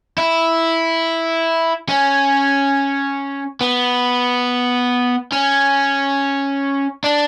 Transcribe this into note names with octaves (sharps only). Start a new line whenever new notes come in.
E4
C#4
B3
C#4
D4